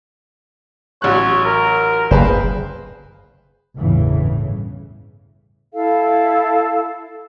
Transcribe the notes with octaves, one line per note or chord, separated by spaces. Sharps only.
A1 F#3 C#5 F#6
A#4
F#1 G#4 B4 C5
G1 E2 A2 C#3 E3
E4 A4 F5